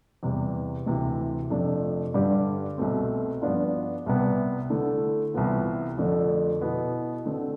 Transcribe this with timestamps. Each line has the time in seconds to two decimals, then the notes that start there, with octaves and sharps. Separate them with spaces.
0.23 E2 C3 G3
0.86 D2 C3 E3
1.50 F2 C3 F3 A3 D4
2.14 G2 D3 G3 D4 G4
2.78 C2 B2 A3 C4
3.42 G2 F3 B3 D4 F4
4.06 C2 C3 G3 B3
4.70 D3 A3 E4
5.34 C2 C3 E3 B3 F4
5.98 F2 D3 A3 D4 A4
6.61 B2 B3 E4
7.26 D3 A3 C4